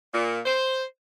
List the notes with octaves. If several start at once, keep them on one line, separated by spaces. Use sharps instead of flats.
A#2
C5